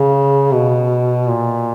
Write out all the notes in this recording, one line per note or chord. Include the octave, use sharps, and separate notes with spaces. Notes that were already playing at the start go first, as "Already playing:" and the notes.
Already playing: C#3
B2
A#2